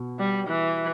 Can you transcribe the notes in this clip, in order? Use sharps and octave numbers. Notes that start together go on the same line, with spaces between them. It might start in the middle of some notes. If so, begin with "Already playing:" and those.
Already playing: B2
G3
E3